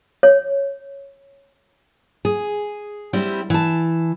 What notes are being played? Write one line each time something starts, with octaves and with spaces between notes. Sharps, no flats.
C#5
G#4
G3 C4 E4
E3 A5